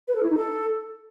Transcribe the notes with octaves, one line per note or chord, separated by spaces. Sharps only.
B4
A4
E4
D#4
A4